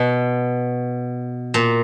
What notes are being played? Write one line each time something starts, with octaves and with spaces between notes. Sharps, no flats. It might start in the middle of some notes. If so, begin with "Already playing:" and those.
Already playing: B2
A#2